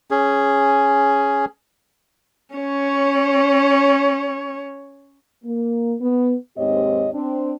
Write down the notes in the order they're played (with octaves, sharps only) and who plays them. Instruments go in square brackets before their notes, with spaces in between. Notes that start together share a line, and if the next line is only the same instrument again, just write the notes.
[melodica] C#4 G#4
[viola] C#4 C#5
[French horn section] A#3
B3
D#2 G#2 C4 G4 C#5 D#5
C4 D4